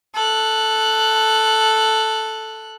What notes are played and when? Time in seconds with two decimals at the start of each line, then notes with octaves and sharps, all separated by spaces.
0.14 A4 F#6